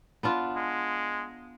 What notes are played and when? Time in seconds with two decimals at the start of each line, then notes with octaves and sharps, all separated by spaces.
0.23 B3 D4 F4
0.56 G#3